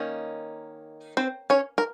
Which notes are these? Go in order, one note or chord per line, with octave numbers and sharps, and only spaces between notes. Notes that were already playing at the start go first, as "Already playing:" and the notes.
Already playing: D#3 A#3 C#4
C4 C5
C#4 C#5
A#4